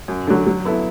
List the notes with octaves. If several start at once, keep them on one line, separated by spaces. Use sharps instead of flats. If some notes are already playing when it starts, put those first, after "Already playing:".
F#2
D3 F#3
F#3
B3 E4 A4